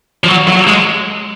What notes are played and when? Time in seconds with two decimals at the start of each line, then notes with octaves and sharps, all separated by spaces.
0.24 F3
0.28 F#3
0.48 F#3
0.67 G#3